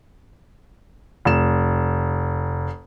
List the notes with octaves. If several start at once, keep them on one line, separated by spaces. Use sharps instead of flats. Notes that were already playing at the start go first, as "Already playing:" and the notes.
F1 E7